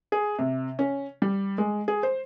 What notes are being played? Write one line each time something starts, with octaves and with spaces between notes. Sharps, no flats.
G#4
C3
C#4
G3
G#3
G#4
C5